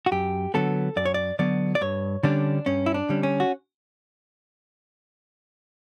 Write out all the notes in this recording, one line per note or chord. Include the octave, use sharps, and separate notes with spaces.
F#4
F#2 G4
D3 F#3 B3 A4
F#2 D5
C#5
D5
D3 F#3 B3 D5
D5
G2 C#5
D3 G3 C#4 D4
G2 C#4
E4
D4
D3 G3 C#4
C#4
F#4